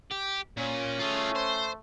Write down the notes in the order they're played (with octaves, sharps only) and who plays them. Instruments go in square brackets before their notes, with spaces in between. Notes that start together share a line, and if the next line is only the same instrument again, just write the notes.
[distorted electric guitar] G4
[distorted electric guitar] A#2 [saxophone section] C#4
[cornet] A3 [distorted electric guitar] F4 G#4
[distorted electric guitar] C5